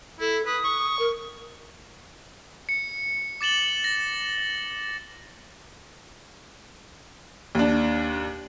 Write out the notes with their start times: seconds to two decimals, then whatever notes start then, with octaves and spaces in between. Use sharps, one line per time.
0.20 E4 A4
0.46 B4 D#6
0.64 C#6
0.99 A#4
2.69 C#7
3.41 D6 A6 E7 F#7 G7
3.84 A#6
7.55 D#2 D4